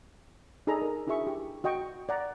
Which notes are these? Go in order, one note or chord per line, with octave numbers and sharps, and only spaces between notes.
D#4 G#4 A4 D5 A#5 B5
A#4
D4 E4 F#4 G#4 E5 C#6
G4
F#4 D#5 G5 C#6
D5 F#5 A#5